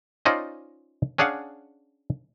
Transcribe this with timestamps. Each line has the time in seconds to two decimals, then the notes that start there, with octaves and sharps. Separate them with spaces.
0.25 C#4 D#4 F4 C5 D5 D#5
1.18 C#4 D4 G#4 F5 F#5